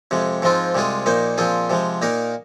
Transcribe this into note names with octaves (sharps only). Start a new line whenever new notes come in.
F2 C3 G#3
G#2 F3 G#3 C4 F4
C2 C3 G#3 F4 G#4
A#1 A#2 A#3 D#4 C5
A#2 F3 C4 F4 G#4
C3 F3 G#3
A#2 A#3 D#4 A#4